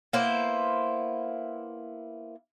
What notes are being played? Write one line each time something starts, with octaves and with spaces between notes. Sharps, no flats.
A#3 B3 E4 C5